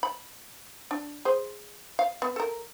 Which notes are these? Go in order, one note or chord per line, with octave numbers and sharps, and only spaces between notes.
B5
D4
G#4 C5
F5
B3
A4 A#4